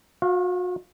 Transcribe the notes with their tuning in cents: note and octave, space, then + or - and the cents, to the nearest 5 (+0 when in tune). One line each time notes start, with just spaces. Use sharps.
F#4 -40 F5 +0